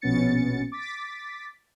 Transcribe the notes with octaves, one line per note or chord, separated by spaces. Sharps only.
A#1 B2 B3 C#4 A6 C#7
D6 A6 B6